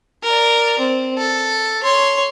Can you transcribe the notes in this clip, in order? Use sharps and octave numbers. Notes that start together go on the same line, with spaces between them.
A#4 D5
C4
A4
C#5 C6